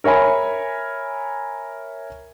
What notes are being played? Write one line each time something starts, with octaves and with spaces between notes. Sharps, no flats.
A#4 C#5 E5 G#5 B5